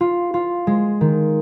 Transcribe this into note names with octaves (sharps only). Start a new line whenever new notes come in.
F4
F4
G#3
D#3